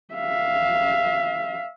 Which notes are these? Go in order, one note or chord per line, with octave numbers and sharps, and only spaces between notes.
E5 F5